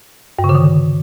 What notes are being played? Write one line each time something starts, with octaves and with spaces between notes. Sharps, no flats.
G2
C#3
D3
D#3